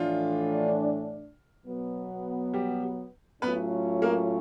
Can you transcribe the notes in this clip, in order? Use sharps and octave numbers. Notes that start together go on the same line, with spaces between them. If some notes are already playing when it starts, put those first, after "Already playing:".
Already playing: A2 E3 F3 A3 D4 F4
B2 F#3 B3
G3 G4
A2 F#3 A3 B3 C#4 F4 B4
A#3 A#4